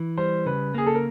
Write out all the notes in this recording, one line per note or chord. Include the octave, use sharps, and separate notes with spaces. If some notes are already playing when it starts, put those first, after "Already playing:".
Already playing: E3
G3 C5
C#3 B4
A#3 G#4
A4
A#4